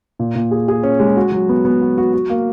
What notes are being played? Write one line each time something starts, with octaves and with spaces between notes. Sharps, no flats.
A#2
A#2
G#4
G#4
C#4
G#3
F#4
F#3
B3
B3
F#4
F#4
F#4
A#3